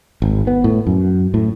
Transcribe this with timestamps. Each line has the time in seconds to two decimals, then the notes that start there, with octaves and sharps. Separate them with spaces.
0.22 G#1
0.47 B3
0.64 A2
0.87 F#2
1.34 A2